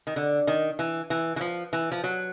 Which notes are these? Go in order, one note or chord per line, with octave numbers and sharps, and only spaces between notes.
D#3
D3
D#3
E3
E3
E3
F3
E3
F3
F#3